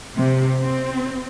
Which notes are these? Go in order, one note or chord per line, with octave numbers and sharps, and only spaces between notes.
C3
C4